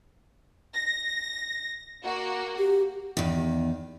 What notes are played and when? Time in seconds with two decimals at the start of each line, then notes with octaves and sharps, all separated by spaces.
0.74 A#6
2.03 A#3 F#4
2.59 G4
3.17 E2 D#3